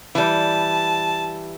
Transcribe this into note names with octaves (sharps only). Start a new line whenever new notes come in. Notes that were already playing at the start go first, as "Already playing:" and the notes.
E3 G3 A5